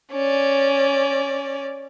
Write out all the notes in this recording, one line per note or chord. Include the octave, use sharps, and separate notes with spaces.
C#4 D5